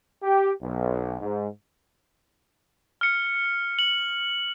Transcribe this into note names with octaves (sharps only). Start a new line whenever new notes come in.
G4
B1
G#2
F6 C#7
F#7